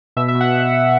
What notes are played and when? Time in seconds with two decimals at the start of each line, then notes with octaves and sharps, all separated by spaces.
0.17 B2 E5
0.28 E5
0.35 B2
0.41 F#5